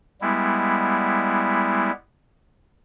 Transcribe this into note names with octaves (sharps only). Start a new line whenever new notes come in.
G3 G#3 B3 E4